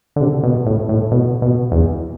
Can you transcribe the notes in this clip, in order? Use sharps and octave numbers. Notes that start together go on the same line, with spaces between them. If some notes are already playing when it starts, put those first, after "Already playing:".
D3
C3
B2
A2
A2
B2
B2
E2